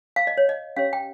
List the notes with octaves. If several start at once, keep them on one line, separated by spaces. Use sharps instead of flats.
F5
D#5
C#5
D#5
C#4 G4 C#5 F5
G5